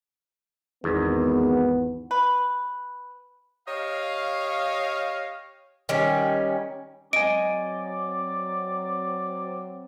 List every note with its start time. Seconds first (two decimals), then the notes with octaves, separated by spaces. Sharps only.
0.84 G#1 E2 B3
2.11 B4
3.67 G4 C#5 D#5 F5
5.89 D#3 G3 C#4
7.13 F#3 C4 D5 D#5 G#5 D7